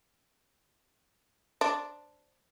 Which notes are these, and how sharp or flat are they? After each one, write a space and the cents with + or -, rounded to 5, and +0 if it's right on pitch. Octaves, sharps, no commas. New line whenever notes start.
D4 +0 C5 +0